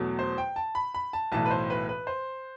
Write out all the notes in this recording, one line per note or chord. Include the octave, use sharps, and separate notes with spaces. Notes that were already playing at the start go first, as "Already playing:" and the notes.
Already playing: E2 B2 F#3 A3
C5
G5
A5
B5
B5
A5
B1 A2 E3 A5
B4
C5
B4
B4
C5